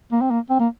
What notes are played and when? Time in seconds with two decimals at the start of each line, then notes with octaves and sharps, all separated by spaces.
0.12 A#3
0.21 C4
0.31 A#3
0.50 C4
0.60 A#3